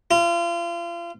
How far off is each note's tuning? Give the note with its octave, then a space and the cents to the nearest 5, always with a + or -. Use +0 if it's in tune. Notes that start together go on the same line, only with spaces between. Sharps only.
F4 -35